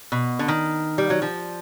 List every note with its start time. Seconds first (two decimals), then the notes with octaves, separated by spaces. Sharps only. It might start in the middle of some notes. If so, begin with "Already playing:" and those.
0.12 B2
0.39 D3
0.48 D#3
0.98 G3
1.10 F#3
1.22 F3